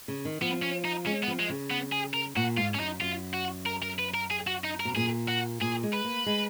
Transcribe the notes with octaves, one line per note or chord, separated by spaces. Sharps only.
C#3
D#3
F3 B3
C#4
D#4
G#3 C#4
B3
F3
G#3
C#3
B3
G#4
A#4
A#2 F#4
G#2 F4
C#4
F#2 D#4
F#2 F4
F#4
A#4
A#4
B4
A#4
G#4
F#4
D#4
A#4
B2
A#2 G#4
F#4
A#2 G#4
G#3
B4
A#3
G#3